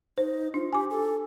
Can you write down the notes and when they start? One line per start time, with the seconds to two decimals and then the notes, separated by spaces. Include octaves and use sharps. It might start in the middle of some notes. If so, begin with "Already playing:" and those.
0.18 D#4 C5
0.54 D4 F4
0.73 G4 G#5 D6
0.90 A4